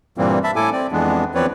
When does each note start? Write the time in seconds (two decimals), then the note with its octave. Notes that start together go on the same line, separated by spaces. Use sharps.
0.18 G2 A#2 E3 G3 A#3 C4
0.44 E5 A5 B5
0.56 A2 E4 A4 G#5 D6
0.73 C4 D5
0.92 F2 E3 G#3 B3 D4
1.35 E2 F3 C4 B4 C#5 D5